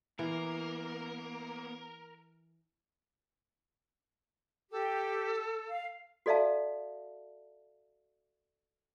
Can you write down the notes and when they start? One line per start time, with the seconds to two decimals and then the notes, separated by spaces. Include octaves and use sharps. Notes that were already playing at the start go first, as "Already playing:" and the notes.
0.19 E3 A#3 B3 A#4
4.72 G4 A4
5.69 F5
6.26 F#4 A4 D5 E5 F5 A5